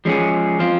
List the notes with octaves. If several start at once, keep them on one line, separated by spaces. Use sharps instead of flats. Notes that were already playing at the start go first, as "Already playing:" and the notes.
F3 G#3 C#4 G#4
F3 C4 F4